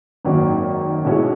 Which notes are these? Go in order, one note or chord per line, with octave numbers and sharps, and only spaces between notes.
G#1 F#2 D#3 F#3 A#3
B1 B2 G#3 C#4 E4